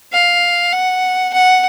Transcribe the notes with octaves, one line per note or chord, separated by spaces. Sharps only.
F5
F#5
F#5